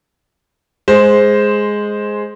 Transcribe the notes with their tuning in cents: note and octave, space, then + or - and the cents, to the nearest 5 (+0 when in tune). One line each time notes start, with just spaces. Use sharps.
G#3 +0 C5 +0